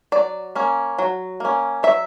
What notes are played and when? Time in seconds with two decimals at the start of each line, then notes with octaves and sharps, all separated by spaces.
0.12 F#3 D5
0.55 A#3 C#4
0.99 F#3
1.40 A#3 C#4
1.83 F#3 E5